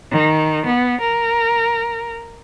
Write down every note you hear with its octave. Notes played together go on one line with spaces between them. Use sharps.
D#3
B3
A#4